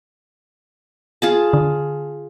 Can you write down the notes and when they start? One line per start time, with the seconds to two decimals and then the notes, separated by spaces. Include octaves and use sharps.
1.22 F4 G#4 A5
1.53 D3